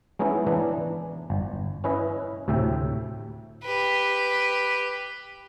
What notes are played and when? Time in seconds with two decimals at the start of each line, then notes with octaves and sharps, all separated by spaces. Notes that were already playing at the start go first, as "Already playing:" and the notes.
0.19 G#3 B3 C#4 D#4 E4
0.47 E3 B3 D4
1.30 G1
1.84 C#4 E4 B4 D#5
2.48 D2 A2 C3 E5 G5
3.63 G4 B4